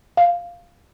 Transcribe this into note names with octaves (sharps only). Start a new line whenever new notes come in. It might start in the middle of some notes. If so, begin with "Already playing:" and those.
F5